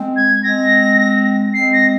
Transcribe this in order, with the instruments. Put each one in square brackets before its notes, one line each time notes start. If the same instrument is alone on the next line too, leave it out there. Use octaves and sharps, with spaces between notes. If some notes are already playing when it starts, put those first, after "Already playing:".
Already playing: [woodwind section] G#3 C4
[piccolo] G#6
[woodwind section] G#3 C4 [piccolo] A#6
[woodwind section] G#3 C4 [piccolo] C7
[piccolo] A#6